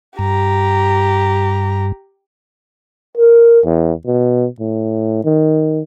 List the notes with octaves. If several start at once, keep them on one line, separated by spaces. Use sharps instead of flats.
G2 G4 A#5
A#4
E2
B2
A2
D#3